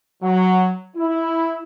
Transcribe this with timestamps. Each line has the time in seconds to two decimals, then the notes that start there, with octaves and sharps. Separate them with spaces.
0.23 F#3
0.97 E4